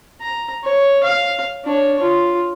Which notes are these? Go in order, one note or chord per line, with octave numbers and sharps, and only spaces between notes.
A#5
C#5
F5
D4 C#5
F4